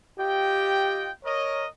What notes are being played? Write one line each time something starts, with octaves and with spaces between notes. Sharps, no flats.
F4 G4 D#5 G5
A#4 C#5 D#5